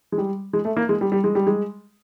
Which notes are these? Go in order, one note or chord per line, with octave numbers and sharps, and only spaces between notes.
G#3
G3
G#3
A3
A#3
G#3
G3
G3
G#3
G3
G#3